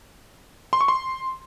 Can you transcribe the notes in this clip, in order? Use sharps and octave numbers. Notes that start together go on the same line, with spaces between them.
C6
C#6
C6